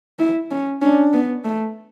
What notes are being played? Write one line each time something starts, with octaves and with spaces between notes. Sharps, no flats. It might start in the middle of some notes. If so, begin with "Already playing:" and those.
E4
C#4
C#4 D4
B3
A3